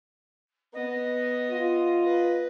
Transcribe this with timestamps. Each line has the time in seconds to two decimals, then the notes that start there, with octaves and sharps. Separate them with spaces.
0.74 B3 D#5
1.51 F4
2.04 B4